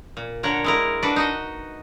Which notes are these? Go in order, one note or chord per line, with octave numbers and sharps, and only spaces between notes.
A#2
D3 A#4 C#5 F#5
G#3 E4 A#4
D4 F#4 B4 D5
D#4 F#4 D#5